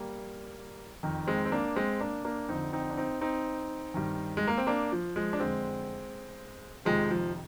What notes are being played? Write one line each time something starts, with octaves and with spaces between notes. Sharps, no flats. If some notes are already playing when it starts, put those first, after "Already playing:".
Already playing: G3 A#3
F2 D#3
G#3 C4
C4
A#3 D4
G#3 C4
A#3 D4
A#3 D4
F2 D3 C4 D#4
C4 D#4
D4
C4 D#4
C4 D#4
G2 D#3
G#3
A#3
C4
A#3 D4
F3
F3 G#3
D4
F2 D3 G#3 C4
F2 C3 D#3 F3 G#3
F3